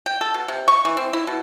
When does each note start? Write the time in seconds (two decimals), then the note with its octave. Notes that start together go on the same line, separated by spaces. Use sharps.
0.06 G5
0.21 A4
0.34 B2
0.48 C3
0.68 C#6
0.85 E3
0.97 C4
1.13 E4
1.27 B2